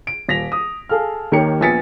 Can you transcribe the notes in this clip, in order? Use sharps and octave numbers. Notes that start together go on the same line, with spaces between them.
D7
D#1 A#6 B6 F7
D#6
G#4 A4 F5 F6
D#2 D#3 G4 A#4 C#5 C#7
A#1 B3 G#5 A6 B6 C#7